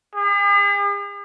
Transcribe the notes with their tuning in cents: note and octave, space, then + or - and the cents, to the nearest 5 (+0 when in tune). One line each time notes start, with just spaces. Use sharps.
G#4 -45